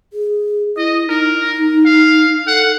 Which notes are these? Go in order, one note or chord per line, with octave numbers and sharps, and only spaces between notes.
G#4
E4 D#5
D#4 A#4
F5
A4 F#5